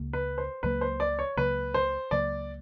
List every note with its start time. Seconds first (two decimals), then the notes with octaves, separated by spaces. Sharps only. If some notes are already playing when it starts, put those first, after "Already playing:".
Already playing: C#2 C#3 A#3
0.13 B4
0.38 C5
0.63 C#2 C#3 F#3 A#3 B4
0.81 C5
1.00 D5
1.19 C#5
1.37 C#2 C#3 F#3 A#3 B4
1.74 C5
2.11 C#2 C#3 F#3 A#3 D5